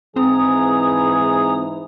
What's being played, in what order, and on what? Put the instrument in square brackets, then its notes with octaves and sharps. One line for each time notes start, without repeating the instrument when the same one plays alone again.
[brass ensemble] G#2 E3 [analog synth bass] C4 [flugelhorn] G#4 [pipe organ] A#5 D#6